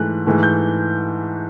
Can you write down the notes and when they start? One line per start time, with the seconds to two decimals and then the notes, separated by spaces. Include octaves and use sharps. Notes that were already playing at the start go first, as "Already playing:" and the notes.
Already playing: G#2 E3 A3 F#6
0.26 G#2 E3 A3
0.43 G6